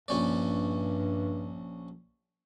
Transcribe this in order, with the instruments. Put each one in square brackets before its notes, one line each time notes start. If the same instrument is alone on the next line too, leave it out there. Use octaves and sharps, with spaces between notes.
[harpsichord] A#1 C#4 D5 [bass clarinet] G2